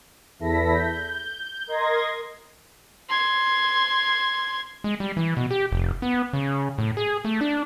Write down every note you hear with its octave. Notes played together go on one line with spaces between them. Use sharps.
E2 E4 A4 A#6 B6
G6
A#4 D#5 C6 G#6 A#6
C6 G#6
G#3
G3
E3
B2
G4
F1
B3
C#3
A2
G#4
A3
D4